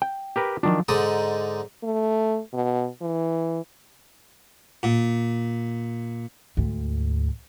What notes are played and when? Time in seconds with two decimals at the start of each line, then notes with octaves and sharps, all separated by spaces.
0.02 G5
0.36 G4 A#4 B4
0.63 D#3 F3 F#3 D4 F4
0.88 G#2 D3 D#4 D5 D#6
1.83 A3
2.53 B2
3.02 E3
4.83 A#2
6.57 D2 G#2